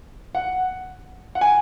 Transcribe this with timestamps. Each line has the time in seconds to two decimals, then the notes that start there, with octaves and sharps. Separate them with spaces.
0.35 F#5
1.35 F#5
1.41 G#5